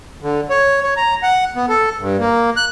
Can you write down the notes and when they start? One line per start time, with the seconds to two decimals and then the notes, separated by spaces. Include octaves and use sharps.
0.23 D3
0.50 C#5
0.83 C#5
0.97 A#5
1.23 F#5
1.56 B3
1.69 A4
2.00 G2
2.20 A#3
2.57 F#6